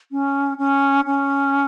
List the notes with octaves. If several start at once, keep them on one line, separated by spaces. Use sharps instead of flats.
C#4
C#4
C#4